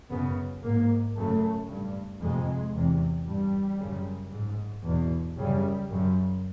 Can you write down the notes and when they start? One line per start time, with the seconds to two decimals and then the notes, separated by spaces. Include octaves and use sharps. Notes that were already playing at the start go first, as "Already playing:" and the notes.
0.10 F#2 C#3 B3
0.63 G#2 A#3
1.16 F#2 C#3 A3
1.68 G2
2.21 F2 C3 G#3
2.73 E2 C3
3.26 G2 G3
3.79 F#2 C#3
4.32 G#2
4.84 E2 B2
5.37 F#2 C#3 G3
5.89 F#2 C#3